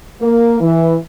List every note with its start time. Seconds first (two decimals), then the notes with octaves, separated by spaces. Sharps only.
0.21 A#3
0.60 E3